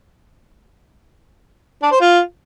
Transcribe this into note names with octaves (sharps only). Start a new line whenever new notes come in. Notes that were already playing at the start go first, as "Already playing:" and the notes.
D4
C5
F4